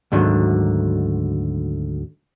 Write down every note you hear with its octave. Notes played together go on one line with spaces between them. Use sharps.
D2 G#2 D3 D#3 F#3